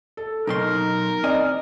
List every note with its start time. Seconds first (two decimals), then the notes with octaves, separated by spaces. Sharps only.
0.17 A4
0.47 B1 B2 D#4 A#4 C6
1.24 C4 D5 D#5 G#5